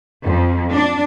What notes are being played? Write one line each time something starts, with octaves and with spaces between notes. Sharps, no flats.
F2
D4